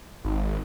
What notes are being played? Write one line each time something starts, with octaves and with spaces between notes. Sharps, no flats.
G#1